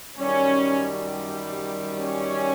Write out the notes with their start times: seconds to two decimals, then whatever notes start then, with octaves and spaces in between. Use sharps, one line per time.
0.20 F#2 D#3 G3 C#4
2.01 C#4